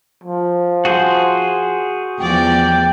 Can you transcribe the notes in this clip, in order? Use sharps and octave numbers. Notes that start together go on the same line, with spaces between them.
F3
F#4 G#4 C5
E2 F3 D5 G5